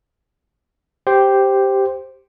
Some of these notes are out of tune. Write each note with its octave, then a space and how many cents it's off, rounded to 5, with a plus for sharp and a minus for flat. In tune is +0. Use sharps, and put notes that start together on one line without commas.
G4 -5 C5 +0